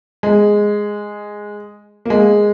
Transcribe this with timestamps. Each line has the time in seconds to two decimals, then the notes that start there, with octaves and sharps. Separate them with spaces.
0.23 G#3
2.05 A#3
2.10 G#3